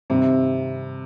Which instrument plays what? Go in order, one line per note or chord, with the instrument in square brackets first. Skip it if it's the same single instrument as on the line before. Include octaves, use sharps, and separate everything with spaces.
[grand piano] G2 D#3 G3 C4 [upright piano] C3